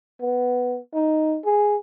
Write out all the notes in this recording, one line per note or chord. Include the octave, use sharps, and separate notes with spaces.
B3
D#4
G#4